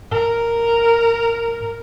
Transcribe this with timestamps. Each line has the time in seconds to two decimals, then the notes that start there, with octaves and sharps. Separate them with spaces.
0.11 G#2 A#4